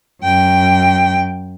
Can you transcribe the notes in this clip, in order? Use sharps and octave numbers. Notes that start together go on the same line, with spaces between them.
F#2 G5